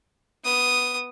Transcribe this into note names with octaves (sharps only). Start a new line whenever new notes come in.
B3 D#6